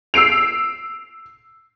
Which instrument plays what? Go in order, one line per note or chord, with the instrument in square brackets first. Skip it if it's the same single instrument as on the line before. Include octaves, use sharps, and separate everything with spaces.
[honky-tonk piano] E6 C7 D7 F7